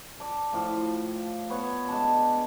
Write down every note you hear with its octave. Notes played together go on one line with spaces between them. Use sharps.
D5 A5
A2 F3 F4 F5
B3 C#5 C#6
G#3 D4 A5